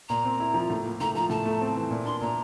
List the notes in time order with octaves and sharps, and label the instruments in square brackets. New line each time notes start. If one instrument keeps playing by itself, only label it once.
[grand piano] A#2 [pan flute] A#5
[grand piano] C4
E4
F3
A2
A#3
[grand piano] A2 [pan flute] A#5
[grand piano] F3 [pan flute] A#5
[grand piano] A2 [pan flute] A5
[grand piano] A3
C4
E3
A#2
[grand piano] D4 [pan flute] C6
[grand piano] A#2 [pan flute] A#5